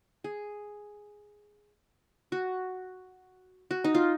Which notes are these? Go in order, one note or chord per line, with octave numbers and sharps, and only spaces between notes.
G#4
F#4
F#4
D#4
F4